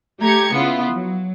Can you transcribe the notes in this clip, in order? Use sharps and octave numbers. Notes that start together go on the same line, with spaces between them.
A3 G4 A#5 G#6 C#7
C#3 B3 E4 F4
F#3